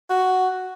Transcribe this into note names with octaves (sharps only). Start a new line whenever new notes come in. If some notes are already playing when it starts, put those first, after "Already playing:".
F#4